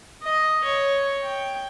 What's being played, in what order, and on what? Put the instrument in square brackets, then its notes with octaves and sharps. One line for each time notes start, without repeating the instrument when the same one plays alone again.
[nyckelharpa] D#5
C#5
G5